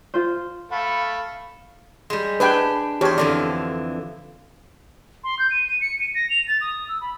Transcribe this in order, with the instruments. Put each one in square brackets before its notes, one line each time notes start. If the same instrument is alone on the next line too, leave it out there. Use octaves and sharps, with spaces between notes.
[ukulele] F4 C5
[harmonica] A3 [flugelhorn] F5 [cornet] B5
[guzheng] G3 G#3
[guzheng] D4 G4 G#5 [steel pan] B4 G5
[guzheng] E2 C5 [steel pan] G4 C#5
[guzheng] F2 D3 E3 [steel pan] D5
[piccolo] C6
G6
D#7
D#7
C#7
D#7
A#6
F7
A6
D#6
E6
B5